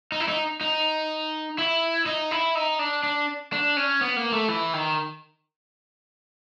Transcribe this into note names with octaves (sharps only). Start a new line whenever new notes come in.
D#4
E4
D#4
D#4
E4
D#4
E4
D#4
D4
D4
D4
C#4
B3
A#3
A3
E3
D#3